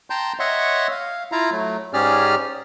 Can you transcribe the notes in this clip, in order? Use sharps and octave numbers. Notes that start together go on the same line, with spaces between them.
G5 A5 A#5 C6 G6
C#5 D#5 E5 F#5 C6 C#6
F5
E4 F4 F5 A#5
F#3 A3
G#2 C#4 G4 G#4 D5 F6